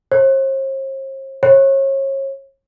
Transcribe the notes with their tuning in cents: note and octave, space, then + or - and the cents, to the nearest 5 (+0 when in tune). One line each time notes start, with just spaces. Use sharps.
C5 +45
C#5 -35